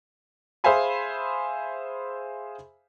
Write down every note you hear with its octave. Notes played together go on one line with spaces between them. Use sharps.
G#4 C5 E5 F5 G#5 B5